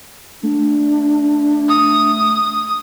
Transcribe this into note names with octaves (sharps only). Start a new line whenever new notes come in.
A3 D4
D#6